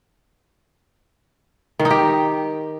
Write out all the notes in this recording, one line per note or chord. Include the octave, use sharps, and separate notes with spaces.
D#3
D#4
G4